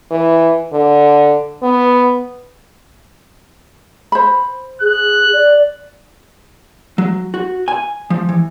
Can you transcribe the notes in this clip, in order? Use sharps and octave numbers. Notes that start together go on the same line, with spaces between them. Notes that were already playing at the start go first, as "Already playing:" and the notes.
E3
D3
B3
C5 B5
G#4 F#6
D5
F#3
F#4
G#5
F3
E3